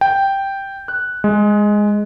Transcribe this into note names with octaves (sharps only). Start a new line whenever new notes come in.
G5
F#6
G#3